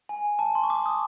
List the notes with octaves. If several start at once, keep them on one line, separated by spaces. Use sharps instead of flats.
G#5
A5
C6
C#6
D6
D#6